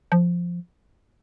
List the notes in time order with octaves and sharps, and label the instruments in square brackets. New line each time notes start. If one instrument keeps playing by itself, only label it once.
[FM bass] F3